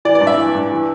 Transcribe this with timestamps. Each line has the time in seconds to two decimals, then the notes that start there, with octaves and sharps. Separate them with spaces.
0.05 E3 D5
0.15 D5
0.21 G2
0.27 E5
0.38 E3
0.55 G2
0.71 E3